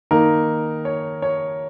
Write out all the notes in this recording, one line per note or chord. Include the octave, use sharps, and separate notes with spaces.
D#3 A#3 D#4 A#4
C#5
C#5